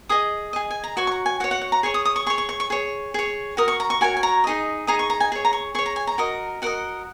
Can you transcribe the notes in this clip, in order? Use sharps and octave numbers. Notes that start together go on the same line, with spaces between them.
G#4 D#5 D#6
G#4 D#5
G#5
A#5
F#4 C#5 C#6
C#6
A#5
G#5
F#4 C#5 F#5
F#5
F#5
A#5
G#4 C#5 C#6
D#6
D#6
C#6
G#4 C#5 C#6
C#6
C#6
C#6
G#4 C#5
G#4 C#5
F#4 A#4 D#6
C#6
A#5
C#6
F#4 A#4 C#5 G#5
G#5
A#5
D#4 G#4 D#5
D#4 G#4 D#5 A#5
C#6
A#5
G#5
G#4 C#5
A#5
C#6
G#4 C#5 C#6
A#5
G#5
A#5
F#4 A#4 D#5
F#4 A#4 D#5 F#5